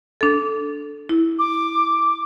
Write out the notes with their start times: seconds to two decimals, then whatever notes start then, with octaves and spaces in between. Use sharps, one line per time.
0.21 D4 A4
1.09 E4
1.39 D6